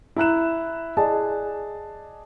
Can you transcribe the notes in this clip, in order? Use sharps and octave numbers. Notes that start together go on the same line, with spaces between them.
E4 A#5 F#6 E7
G#4 D5 D#5 A5